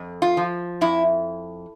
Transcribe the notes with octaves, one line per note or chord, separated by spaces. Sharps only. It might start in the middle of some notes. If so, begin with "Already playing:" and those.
Already playing: F2
F4
F3
F2 E4